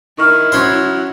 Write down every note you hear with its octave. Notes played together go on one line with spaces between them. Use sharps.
D#3 E4 C#6 F6
F#3 C#4 C5